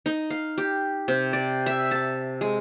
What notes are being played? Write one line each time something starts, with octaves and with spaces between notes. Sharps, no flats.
D#4
F5
G4
C3
D5
E5
A5
G#3